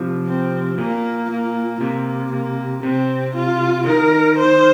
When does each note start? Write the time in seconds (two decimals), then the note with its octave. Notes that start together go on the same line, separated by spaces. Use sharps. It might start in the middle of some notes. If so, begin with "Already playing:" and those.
Already playing: C3 F3
0.26 C4
0.78 A#2 A#3
1.30 A#3
1.81 C3 A#3
2.32 A#3
2.83 C3 C4
3.36 F4
3.86 D#3 A#4
4.38 C5